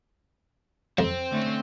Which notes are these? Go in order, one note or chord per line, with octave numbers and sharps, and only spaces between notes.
F2 C4
D3 A3 C#4